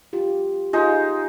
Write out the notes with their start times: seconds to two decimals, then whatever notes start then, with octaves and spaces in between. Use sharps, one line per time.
0.13 F4 G4
0.73 G#3 D#4 F4 G4